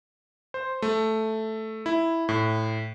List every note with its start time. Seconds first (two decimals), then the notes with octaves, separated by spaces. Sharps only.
0.54 C5
0.82 A3
1.86 E4
2.29 A2